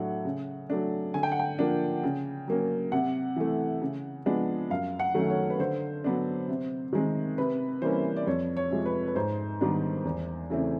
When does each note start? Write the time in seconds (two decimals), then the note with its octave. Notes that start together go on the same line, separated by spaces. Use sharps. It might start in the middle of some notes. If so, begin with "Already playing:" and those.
Already playing: A2 F#3 A3 D4 F#5
0.25 C#3
0.70 F#3 A3 D4
1.14 D3 G#5
1.23 G5
1.32 F#5
1.39 G5
1.59 F3 A#3 D4
2.04 C#3
2.48 F#3 A#3 C#4
2.92 C3 F#5
3.36 E3 A3
3.81 C#3
4.26 F3 G#3 B3 D4
4.70 F#2 F5
5.00 F#5
5.14 D#3 F#3 A3 C#4
5.30 C#5
5.50 B4
5.59 D3 C5
6.04 F#3 B3 D4
6.48 C3
6.93 D#3 G#3 C4
7.38 C3 B4
7.82 E3 G3 A#3 C#4 C5
8.16 D5
8.27 F2 C#5
8.57 C#5
8.71 C3 F3 G#3
8.86 B4
9.08 B4
9.15 G#2 C5
9.61 D#3 G3 B3 D4
10.05 E2
10.50 C#3 E3 A3 C4